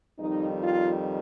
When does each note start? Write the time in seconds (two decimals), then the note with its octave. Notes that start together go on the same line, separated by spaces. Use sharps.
0.19 F2 D#3 G3 D#4
0.63 F4